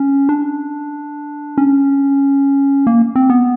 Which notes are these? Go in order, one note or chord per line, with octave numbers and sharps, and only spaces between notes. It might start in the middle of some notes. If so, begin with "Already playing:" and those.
Already playing: C#4
D4
C#4
A#3
C4
B3